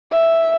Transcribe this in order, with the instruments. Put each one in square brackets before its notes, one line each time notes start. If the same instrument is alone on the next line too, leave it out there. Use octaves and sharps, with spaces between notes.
[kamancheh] E5